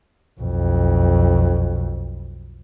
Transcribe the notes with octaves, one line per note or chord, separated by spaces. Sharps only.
B1 F2